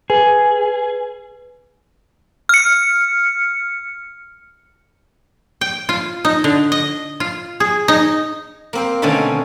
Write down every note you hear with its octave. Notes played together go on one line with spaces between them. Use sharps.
G#4 B4
F6 C#7
G5
F4
D#4
D3
D#5
F4
G#4
D#4
A#3 C4 C5
B2 D3 D#3 A3 C4 C#4